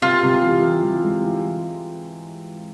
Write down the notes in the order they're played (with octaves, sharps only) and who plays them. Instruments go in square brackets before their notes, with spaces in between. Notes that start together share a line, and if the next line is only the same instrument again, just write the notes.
[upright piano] C3 [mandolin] F4
[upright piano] C3
E3
E3
E3
G#3
E3